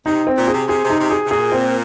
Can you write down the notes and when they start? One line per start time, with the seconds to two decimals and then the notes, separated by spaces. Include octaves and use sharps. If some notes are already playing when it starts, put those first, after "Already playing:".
0.06 C3 D#4
0.27 C4
0.37 A#2
0.48 G#4
0.53 C3
0.68 C3 G#4
0.84 C3
0.90 D#4
1.00 C3
1.11 G#4
1.26 C3
1.31 A#2 G#4
1.52 C4